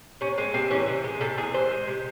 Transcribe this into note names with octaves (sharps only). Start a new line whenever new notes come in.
C3 C#4
G#3 C4
C3 C4
E3 C#4
C3
G#3
C3 A4
E3 G#4
C3 C5
G#3
C3